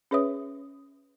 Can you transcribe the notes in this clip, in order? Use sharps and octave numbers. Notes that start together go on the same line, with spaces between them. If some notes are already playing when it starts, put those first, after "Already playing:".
C#4 G#4 B4 C#5 E5 D#6